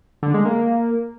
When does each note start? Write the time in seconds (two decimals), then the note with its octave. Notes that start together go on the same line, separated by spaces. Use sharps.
0.22 D3
0.34 G#3
0.45 A#3